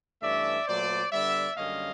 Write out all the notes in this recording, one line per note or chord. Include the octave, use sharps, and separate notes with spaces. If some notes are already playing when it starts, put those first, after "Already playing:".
G2 E3 A3 C#4 D5 E5
A#2 F#3 A3 C5 D5
D3 G3 B3 D5 E5
F#2 D3 G3 A#3 C#4 D#5 F5